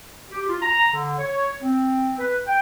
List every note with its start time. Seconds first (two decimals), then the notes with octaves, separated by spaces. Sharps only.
0.31 G4
0.48 F4
0.62 A#5
0.93 D3
1.19 C#5
1.62 C4
2.19 B4
2.47 G5